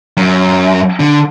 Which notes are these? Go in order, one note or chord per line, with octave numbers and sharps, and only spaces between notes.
F#2
D3